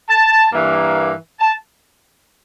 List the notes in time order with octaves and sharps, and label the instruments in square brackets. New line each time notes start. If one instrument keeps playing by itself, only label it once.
[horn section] A5
G2 E3 A#3
A5